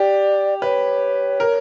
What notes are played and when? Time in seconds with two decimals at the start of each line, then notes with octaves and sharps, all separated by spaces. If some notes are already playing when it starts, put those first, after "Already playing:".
Already playing: G4 D5
0.62 B4 C#5
1.40 A#4